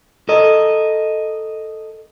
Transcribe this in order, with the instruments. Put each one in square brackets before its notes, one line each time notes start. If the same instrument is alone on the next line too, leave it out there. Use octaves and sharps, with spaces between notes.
[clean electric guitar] A4 A#4 D#5